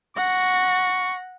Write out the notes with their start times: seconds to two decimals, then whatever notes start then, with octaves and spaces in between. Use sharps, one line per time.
0.16 F#5 C#6 A#6